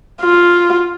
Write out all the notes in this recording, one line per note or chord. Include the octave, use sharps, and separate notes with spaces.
F4